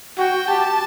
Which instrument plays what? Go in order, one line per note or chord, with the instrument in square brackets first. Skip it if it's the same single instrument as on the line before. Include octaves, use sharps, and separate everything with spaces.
[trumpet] F#4 [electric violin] G5
[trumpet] G4 [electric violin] A5